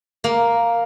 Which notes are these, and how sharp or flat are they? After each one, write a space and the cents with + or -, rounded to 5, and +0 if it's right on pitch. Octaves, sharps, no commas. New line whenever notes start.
A#3 +0